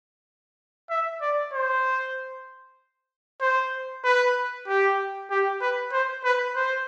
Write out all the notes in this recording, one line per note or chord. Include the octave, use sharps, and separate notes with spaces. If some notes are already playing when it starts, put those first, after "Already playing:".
E5
D5
C5
C5
B4
G4
G4
B4
C5
B4
C5